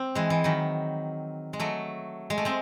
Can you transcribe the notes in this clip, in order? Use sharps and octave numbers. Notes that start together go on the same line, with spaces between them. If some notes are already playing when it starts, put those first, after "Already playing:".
Already playing: C4
E3 G#3
E3
D#3 F#3
G#3
F#3 A3
G#3
A3
G#3 C4